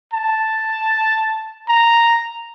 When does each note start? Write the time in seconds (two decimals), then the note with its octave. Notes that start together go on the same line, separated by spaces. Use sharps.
0.13 A5
1.68 A#5